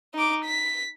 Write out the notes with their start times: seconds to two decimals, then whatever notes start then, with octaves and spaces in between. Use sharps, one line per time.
0.14 D#4 D6
0.44 B6